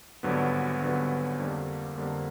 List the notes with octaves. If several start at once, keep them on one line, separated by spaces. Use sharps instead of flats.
G#1 G2 D3 F#3 B3
G#1 G2 D3 F#3 B3
F2 D3 G3 A#3
F2 D3 G3 A#3